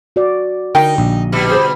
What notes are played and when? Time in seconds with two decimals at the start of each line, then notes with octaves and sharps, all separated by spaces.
0.16 F#4 D5
0.75 D3 D#4 A#4 G5
0.98 A#1
1.32 B2 G3
1.50 G#4 C5